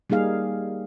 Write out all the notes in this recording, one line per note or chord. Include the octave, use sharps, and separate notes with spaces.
G3 A#3 D#4 G#4 F5